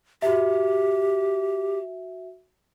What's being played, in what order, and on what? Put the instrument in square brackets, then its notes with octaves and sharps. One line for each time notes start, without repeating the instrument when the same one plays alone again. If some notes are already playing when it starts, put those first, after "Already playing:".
[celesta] F#4 E5 [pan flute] G4